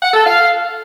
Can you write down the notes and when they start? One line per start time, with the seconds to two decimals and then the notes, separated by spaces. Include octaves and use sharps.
0.02 F#5
0.14 A4
0.25 F5